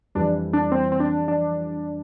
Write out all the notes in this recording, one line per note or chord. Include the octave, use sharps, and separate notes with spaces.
F2 E3 G3 D4
D4
C4
C4
D4
D4